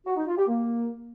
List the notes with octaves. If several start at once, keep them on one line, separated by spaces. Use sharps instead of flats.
F#4
D#4
F4
G4
A#3